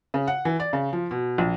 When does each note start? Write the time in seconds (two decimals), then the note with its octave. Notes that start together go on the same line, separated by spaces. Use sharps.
0.14 C#3
0.27 F#5
0.45 E3
0.60 D5
0.73 C#3
0.93 F3
1.11 B2
1.38 A#1